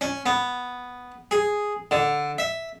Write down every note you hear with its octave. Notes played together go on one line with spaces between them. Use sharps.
C#4
B3
G#4
D3
E5